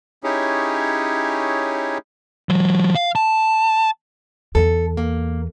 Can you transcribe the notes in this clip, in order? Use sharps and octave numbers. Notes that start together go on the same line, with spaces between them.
C#4 D#4 E4 G4 G#4 C#5
E3 F#3
F5
A5
E2 A4
A#3